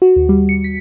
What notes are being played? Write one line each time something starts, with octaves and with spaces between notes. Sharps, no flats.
F#4
D#2
G3
C#7
B6